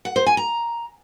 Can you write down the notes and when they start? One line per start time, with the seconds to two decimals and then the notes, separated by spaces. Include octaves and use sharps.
0.05 F#5
0.16 C5
0.26 G#5
0.37 A#5